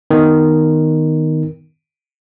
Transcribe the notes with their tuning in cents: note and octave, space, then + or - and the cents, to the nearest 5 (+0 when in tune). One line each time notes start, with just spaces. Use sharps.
D#3 +0 B3 +0